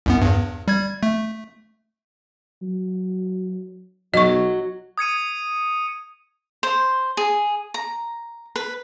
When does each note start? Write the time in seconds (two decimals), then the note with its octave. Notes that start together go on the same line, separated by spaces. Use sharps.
0.06 C2 F#2 B3
0.22 E2 G2
0.68 G3 G#6
1.03 A3
2.62 F#3
4.14 B1 F#3 D#5 C#6
4.98 D#6 G#6 C#7 D#7
6.63 C5
7.17 G#4
7.74 A#5
8.56 B4